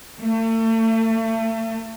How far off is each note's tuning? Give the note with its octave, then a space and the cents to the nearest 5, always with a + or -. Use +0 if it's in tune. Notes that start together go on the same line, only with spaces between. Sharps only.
A3 +35